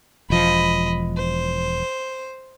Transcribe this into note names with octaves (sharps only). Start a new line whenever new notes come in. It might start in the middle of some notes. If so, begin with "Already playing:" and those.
E1 F3 D#5 B5
C5